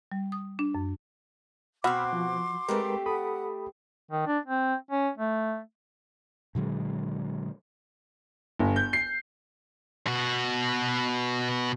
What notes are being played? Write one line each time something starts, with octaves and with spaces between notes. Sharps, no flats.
G3
D#6
D4
F#2
B2 C4 F#4 B5 C6 D6 E6 F6
F3
G#3 A3 C4 G4 A#4 B4
A4 F#5 B5 D#6
D#3
D4
C4
C#4
A3
A#2 D3 F#3 G#3
G1
G6
C7
B2 F#4